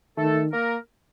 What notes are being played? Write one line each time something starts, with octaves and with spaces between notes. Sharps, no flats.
D#3 A3 A4
A#3 A#4